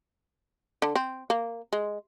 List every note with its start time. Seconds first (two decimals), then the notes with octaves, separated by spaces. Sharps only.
0.82 D3
0.96 C4
1.30 A#3
1.73 G#3